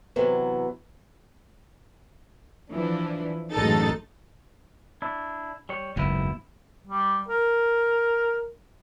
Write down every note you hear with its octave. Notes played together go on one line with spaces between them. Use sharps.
C3 E3 F#3 B3
E3 F3 D4
A1 F#2 G#3 D#4 A4 A6
D4 E4
G3 C#5
F#1 D#2 G#2 B2 E4
G3
A#4